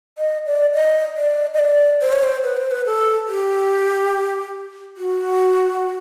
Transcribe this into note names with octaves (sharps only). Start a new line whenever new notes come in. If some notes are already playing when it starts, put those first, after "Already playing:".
D#5
D5
D#5
D5
D#5
D5
C5
C#5
C5
B4
C5
B4
A4
G4
F#4